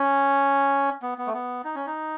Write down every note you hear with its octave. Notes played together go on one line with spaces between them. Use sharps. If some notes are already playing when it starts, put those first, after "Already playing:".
Already playing: C#4
B3
B3
A3
B3
D#4
C#4
D#4